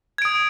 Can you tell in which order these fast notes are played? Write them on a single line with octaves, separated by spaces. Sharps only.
G#6 D7 D#6